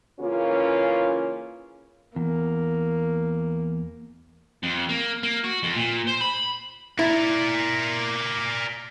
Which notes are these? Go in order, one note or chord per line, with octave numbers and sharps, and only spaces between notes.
C#3 E3 A#3 C#4 F4
E2 A#3
F2
A#3
A#3
F#4
F2
A#2
C5
B5
E4 A#4 D5